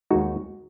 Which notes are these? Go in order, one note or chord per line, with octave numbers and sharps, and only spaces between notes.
D#2 D#3 G#3 D#4 F#4